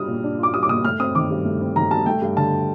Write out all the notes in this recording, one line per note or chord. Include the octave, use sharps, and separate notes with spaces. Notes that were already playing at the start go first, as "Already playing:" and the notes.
Already playing: G3 D4 F4 D#6 F6
A#2
D4
F4 D6
G3 D#6
D6
A#2 D#6
A3 F6
C4 D#6
D#3 D6
G2
A3
C4
D#3 A#5
G2 A5
A3 G5
G2
D3 A5